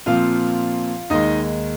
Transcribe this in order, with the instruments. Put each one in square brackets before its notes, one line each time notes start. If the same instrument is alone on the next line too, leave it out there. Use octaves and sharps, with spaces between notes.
[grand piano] A#2 F3 C4 F4 F5
D#2 D#3 G#3 D#4 D#5